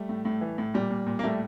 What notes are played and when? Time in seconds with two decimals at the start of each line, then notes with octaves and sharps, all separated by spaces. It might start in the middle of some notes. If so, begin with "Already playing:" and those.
Already playing: G3 A3
0.09 A2
0.25 A2
0.41 E3
0.58 A2
0.74 A#2 G3
0.91 A#2
1.07 A#2
1.19 A#3
1.23 A2 G3 A3